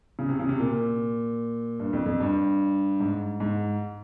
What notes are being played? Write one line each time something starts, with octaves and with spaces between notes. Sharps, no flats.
C#3
C3
C#3
C3
A#2
G2
F2
F2
G2
G#2
G#2